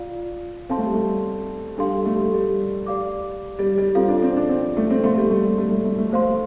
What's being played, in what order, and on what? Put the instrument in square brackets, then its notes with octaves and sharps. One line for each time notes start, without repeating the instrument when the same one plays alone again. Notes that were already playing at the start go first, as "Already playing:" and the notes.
Already playing: [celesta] F4 D5 F5
[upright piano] C4 [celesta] A4 F5 A5 C6
[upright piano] A3
G3
A3
[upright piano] G3 [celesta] D4 A4 F5 C6
[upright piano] A3
G3
G3
[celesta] G4 D5 F5 D6
[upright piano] G3
G3
[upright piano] C4 [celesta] F4 A4 F5
[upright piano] D4
C4
D4
C4
A3
C4
[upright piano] A3 [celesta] C5 F5 C6
[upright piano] G3
A3
G3
A3
A3
A3
A3
[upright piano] A3 [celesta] C5 F5 C6